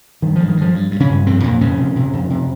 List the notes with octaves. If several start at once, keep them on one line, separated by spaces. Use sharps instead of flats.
G2 D#3
G2 F3
D#3
G2 F3
G2
G2
C#3 C#4
G2
F2 C3 C4
F2 A#2 A#3
F2 C#3 C#4
C3
C3
F2
C3